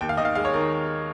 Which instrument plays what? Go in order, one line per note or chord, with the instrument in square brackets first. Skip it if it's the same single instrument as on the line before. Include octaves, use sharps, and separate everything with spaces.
[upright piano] D#2 G5
F5
D#3 D#5
F5
G#3 F5
C#5
D#3 A#4